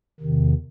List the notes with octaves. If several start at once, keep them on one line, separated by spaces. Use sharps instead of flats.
E2 C3 D#3